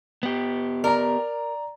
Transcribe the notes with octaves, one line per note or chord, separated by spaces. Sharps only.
B3 G4
A#4 D5 A#5